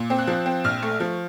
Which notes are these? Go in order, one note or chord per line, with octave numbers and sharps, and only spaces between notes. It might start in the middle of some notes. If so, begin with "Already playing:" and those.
Already playing: A#2
C4
F#6
F3
C4
A#1 F6
A3
F3